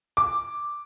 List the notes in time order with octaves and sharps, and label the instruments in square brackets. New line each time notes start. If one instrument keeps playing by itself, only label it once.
[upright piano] D6